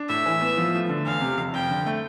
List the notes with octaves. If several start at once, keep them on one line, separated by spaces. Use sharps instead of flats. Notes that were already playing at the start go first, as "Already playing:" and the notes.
Already playing: D4
A2 E5
E3
B3
F3
A3
D3
E2 F5
C3
F1
F2 G5
D3
A3